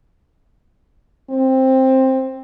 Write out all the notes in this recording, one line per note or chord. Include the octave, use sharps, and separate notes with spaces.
C4